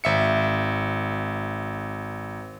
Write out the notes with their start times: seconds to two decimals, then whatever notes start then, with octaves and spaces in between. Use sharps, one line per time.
0.04 G#1 E5 C#7